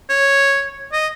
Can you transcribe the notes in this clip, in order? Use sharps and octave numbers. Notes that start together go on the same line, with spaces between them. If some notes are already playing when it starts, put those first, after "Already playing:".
C#5
D#5